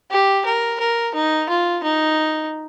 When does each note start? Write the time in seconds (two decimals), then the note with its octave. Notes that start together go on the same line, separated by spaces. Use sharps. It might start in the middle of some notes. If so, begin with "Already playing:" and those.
0.11 G4
0.46 A#4
0.80 A#4
1.15 D#4
1.49 F4
1.84 D#4